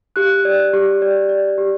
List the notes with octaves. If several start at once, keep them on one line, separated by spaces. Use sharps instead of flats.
G4 F#6
D5
G4
D5
D5
G4